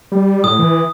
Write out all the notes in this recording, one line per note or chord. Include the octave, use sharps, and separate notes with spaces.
G3
A2 D#6
E3